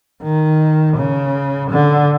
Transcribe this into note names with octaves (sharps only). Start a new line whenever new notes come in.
D#3
C#3
D3